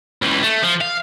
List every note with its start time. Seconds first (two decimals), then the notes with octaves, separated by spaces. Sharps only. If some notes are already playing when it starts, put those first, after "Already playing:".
0.22 C#2 E3
0.43 A3
0.63 F3
0.81 F5